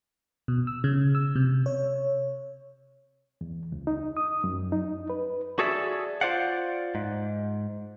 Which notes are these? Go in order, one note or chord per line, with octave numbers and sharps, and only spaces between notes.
B2
E6
C#3
E6
C3
C#5
E2
C#2
D#4
D#6
F#2
D#4
B4
F#4 G#4 A4 D5 E5
F4 C5 D5 F5 F#5
G#2